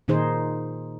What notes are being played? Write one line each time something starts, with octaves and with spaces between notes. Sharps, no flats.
A#2 D#3 D#4 G#4 C5